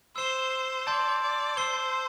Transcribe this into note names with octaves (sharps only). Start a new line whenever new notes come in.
C5 E6 C7 E7 G7
D5 A5 C6 G6
D5
C5 E6 C7 G7